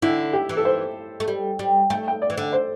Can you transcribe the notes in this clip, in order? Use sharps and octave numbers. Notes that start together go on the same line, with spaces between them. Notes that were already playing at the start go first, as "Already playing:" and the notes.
D3 E4
G4
E3
A4
C5
A3
G3
G3
A3 G5
G5
D5
E3
D3
C5